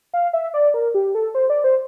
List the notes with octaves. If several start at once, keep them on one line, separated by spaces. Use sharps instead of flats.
F5
E5
D5
A#4
G4
A4
C5
D5
C5